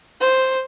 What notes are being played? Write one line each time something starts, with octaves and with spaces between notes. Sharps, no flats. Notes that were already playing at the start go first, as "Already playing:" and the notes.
C5